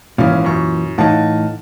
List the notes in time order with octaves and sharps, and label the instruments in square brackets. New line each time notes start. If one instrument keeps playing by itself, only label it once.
[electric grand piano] G#1 C#4 F5 [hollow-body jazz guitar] A#2 E3
[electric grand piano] F#2 C#6
[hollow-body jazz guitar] A2 E3 D#4 [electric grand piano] F5 F#5 A5